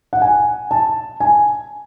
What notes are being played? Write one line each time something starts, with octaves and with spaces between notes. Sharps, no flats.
F#5
G#5
A5
G#5